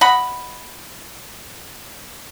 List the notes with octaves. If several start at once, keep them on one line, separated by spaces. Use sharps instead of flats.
D#5 F#5 B5